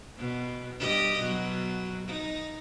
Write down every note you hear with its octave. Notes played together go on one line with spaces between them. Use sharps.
B2
G2 G4 D#5
B2 F#3
D#4